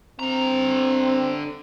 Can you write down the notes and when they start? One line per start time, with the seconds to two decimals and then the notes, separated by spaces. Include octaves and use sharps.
0.20 D3 C4 A#5